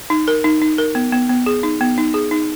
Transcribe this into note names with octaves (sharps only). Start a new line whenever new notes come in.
D#4
A#4
D#4
D#4
A#4
B3
B3
B3
G#4
D#4
B3
D#4
G#4
D#4